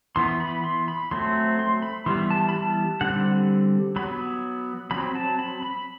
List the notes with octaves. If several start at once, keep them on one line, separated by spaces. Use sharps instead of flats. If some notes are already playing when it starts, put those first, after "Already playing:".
E3 B3 C6
B5
C6
B5
F#3 A3 C4 C6
C6
B5
E3 G3 B3 C6
A5
B5
A5
D3 G3 C4 F#5
F#3 B3 B5
F#3 C4 B5
A5
B5
B5